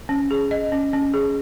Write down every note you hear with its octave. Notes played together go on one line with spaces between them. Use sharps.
C#4
G#4
D#5
C#4
C#4
G#4